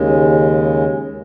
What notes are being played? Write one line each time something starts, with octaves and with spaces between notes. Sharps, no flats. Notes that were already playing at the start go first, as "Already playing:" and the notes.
Already playing: D#2 C#3 G#3